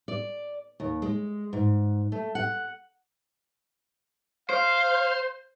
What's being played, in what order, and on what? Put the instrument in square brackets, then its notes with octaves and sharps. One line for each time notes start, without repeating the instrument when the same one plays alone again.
[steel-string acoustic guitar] D5
D#2
G#3
G#2
A3
F#5
[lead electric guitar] C5 [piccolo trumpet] F5